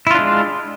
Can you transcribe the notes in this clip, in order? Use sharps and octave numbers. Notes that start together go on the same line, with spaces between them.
G#3 D4 E4 F4